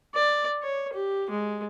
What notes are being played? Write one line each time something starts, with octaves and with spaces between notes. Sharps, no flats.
D5
C#5
G4
G#3